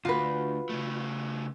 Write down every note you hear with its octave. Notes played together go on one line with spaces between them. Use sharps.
D2 F4 F#4 B4
C#3 A3